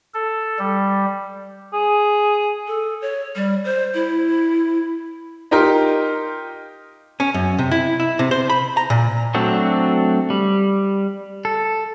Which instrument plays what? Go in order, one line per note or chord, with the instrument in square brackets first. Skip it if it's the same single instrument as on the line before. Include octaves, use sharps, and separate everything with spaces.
[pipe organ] A4
G3
[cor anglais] G#4
[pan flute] A4
C#5
G3
C5
E4
[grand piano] D#4 F4 G4 A#4
[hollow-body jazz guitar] C#4
F#2
C3
E4
E4
C3
C5
B5
A#5
A#2
[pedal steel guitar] F#3 A3 C4 D4 F#4
G3
A4